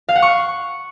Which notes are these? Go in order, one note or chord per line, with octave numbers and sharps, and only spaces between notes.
F5
F#5
C#6